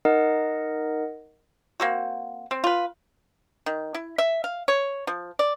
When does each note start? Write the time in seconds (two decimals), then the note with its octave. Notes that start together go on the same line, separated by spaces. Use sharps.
0.05 D#4 A#4 D#5 F#5
1.80 A#3 C4 F#4
2.51 C4
2.64 F4 B4
3.66 D#3
3.94 E4
4.18 E5
4.44 F5
4.68 C#5
5.07 F3
5.39 D5